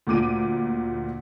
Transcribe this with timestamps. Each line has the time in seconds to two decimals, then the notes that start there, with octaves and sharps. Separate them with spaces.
0.07 D2 A#2 D6 D#7